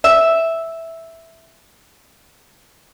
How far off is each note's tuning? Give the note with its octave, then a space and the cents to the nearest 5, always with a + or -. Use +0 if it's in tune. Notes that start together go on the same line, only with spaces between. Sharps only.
E5 -5